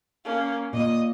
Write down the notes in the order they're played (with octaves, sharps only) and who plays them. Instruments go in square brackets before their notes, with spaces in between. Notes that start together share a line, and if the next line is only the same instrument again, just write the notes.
[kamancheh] A#3 C#4
[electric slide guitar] A#2 [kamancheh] D#5 D#6